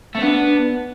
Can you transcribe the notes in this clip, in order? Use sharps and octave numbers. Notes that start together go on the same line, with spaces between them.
A3 C4
B3 D4